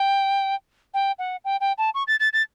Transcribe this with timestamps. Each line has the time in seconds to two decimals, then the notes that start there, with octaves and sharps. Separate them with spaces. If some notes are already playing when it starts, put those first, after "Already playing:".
Already playing: G5
0.94 G5
1.19 F#5
1.45 G5
1.61 G5
1.78 A5
1.94 C#6
2.07 A6
2.20 A6
2.33 A6